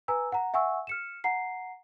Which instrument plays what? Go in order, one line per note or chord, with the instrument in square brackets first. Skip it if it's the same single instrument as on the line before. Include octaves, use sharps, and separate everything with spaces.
[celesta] B4 G#5 A#5 E6
F#5 A#5
E5 F#5 G#5 C#6 E6
F6 C#7 E7
F#5 A#5 C7